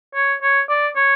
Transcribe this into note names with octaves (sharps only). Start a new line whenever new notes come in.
C#5
C#5
D5
C#5